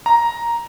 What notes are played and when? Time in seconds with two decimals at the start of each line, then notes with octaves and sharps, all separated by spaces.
0.06 A#5